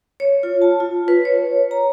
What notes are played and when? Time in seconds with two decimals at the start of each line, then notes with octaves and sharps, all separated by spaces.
0.20 C#5
0.43 F4
0.62 A5
0.80 F4
1.08 B4
1.25 C#5
1.71 A#5